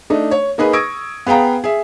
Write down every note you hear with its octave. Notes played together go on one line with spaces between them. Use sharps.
A3 D4 D#4
C#5
A#3 D#4 G#4 B4
C#6 D#6 E6 G#6 A#6 D7
B3 G#4 F5 G5 A#5
G#4 E5